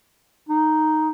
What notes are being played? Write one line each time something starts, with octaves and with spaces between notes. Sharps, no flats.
D#4